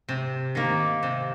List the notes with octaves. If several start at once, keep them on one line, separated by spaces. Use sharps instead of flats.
C3
D#3 A#3
C3